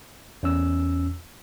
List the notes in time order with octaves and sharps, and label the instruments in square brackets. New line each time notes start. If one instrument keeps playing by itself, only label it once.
[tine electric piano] E2 C#4 E6